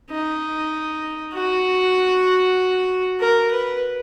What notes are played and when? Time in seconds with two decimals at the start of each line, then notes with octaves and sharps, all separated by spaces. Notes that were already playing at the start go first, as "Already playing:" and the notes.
0.10 D#4
1.34 F#4
3.20 A#4
3.51 B4